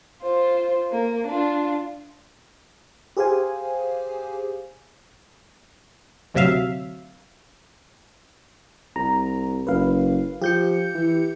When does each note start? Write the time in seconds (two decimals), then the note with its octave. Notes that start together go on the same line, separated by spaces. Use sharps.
0.22 F4 C5
0.92 A#3
1.27 D4 F4
3.17 G4 G#4 C5 F5 G#5
6.34 D2 C3 F#3 E5 F5
8.96 C2 A#5
9.67 F#1 B4 F5
10.42 F3 G4 G6 C#7
10.95 E3